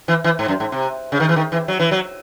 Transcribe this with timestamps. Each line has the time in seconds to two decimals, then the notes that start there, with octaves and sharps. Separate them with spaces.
0.08 E3
0.24 E3
0.39 G#2
0.48 F#2
0.60 G#2
0.72 C3
1.12 C#3
1.20 D#3
1.29 E3
1.36 D#3
1.52 E3
1.68 F#3
1.80 E3
1.91 F#3